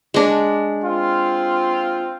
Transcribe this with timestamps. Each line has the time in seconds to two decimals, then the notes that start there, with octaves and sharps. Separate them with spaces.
0.14 G#3 D4
0.84 C4 F4